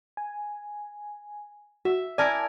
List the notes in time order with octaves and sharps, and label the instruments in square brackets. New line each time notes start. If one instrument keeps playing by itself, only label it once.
[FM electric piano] G#5
[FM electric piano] F#4 [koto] E5
[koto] E4 A#4 G#5 [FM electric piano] D5 A5